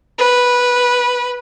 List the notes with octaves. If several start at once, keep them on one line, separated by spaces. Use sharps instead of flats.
B4